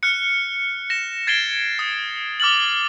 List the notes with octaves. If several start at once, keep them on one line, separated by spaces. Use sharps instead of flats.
F6 F#6 C#7
A#6 E7
G#6 A6 C7 D7 E7 G7
D#6
D6 F6 A6 F#7